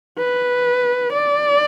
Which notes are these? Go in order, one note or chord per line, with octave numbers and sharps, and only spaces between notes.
B4
D5